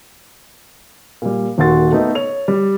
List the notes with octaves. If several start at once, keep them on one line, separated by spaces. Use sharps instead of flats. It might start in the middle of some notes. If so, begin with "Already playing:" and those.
A#2 G3
D#1 D#2 D#3 F#4 C6 A6
A3 B3 D#4
C#5 F7
G3